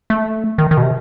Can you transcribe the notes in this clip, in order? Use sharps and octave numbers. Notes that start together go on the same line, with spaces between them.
A3
D#3
D#3
B2
C3